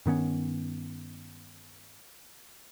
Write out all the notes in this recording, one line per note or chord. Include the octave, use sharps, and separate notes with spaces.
G2 D#3 B3 C#4